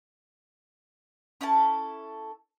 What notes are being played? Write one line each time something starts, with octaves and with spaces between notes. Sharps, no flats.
C#4 E4 A4 A5